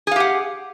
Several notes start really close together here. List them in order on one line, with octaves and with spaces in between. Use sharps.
G#4 F5 G4 F#5